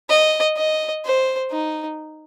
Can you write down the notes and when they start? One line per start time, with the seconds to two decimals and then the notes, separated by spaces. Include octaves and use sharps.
0.09 D#5
0.56 D#5
1.05 C5
1.51 D#4